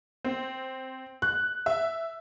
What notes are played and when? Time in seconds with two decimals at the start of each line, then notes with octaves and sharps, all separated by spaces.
0.25 C4
1.22 F#6
1.66 E5